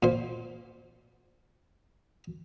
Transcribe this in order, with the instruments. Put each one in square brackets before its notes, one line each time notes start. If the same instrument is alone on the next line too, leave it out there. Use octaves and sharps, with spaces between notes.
[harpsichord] A#2 C5